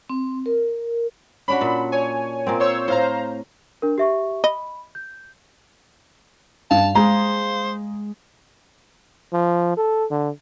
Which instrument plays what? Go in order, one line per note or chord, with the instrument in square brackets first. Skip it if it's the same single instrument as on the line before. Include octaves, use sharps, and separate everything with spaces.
[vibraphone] C4
A#4
[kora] C#4 D4 F#4 [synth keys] B5
[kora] A#2 E5
[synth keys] C#5 G#5
[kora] A#2 A#3 C4
[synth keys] C5 C#5 E6
[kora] A2 [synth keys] C5 F5 A#5
[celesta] D4 A#4
G4 E5 C#6
[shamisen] D#5 [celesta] B5
[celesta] G6
[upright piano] G2 [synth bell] F5 [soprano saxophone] A5
[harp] G#3 G#4 [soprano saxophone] C5 [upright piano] A#5
[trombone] F3
A4
D3